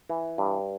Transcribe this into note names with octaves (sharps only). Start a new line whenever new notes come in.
E3
G2